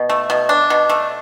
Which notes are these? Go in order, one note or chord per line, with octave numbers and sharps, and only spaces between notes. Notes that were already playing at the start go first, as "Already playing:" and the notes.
Already playing: B2
A3
B2
D4
B2
A3